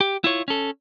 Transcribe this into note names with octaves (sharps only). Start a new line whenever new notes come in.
G4
E4 F4 C#5
C#4 A4